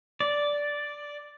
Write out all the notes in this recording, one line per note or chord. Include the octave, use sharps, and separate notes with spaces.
D5